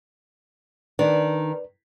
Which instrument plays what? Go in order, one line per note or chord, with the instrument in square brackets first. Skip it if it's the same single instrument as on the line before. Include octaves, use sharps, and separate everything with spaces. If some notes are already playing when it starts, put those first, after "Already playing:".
[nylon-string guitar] D#3 D4 [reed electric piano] B4 D5